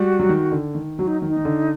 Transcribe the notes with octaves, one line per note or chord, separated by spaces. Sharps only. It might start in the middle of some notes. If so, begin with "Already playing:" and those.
Already playing: G3 F#4
F#3
D#3
D3
D#3
F#3 F#4
D#4
D#3
D#4
D#3
D3